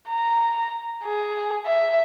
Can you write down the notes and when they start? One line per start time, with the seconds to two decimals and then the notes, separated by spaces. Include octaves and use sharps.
0.10 A#5
1.04 G#4
1.66 E5